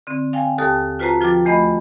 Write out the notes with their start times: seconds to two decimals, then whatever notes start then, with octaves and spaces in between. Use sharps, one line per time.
0.07 D3 C4
0.33 F5 G5 G#5
0.58 D#2 G4 A4 A5 D#6
0.99 F4 F#4 B4 C5 A5 A#5
1.21 F3 F4 G5 D6 A6
1.45 E2 A3 D#5 B5